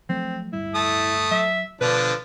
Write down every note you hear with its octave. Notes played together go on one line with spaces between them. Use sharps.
F3 F#3 A3 C4
D1 G1 G3 E4
A3 A5 D#6
F#3 E5
B2 D3 F3 D4 B4